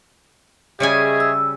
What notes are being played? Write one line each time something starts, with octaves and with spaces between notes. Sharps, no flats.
C#3 G3 G#4 C#5 D#5 E5 G#5
E6